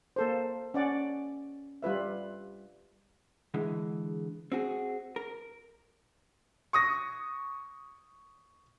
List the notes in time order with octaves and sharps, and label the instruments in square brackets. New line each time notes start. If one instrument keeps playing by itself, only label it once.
[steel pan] A#3 A4 C5
C#4 D5 F#5
G3 F4 B4 E5
[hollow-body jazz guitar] D3 E3 G#3
C4 F#4 G#4
A#4
[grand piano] C#6 D#6 A#6